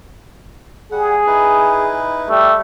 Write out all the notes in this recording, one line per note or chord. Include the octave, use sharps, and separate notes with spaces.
G3 G#4 F#5
D#4 E4 B4
G3 A3